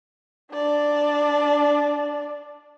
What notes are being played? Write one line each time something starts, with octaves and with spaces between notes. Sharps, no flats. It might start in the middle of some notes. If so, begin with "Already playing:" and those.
D4 D5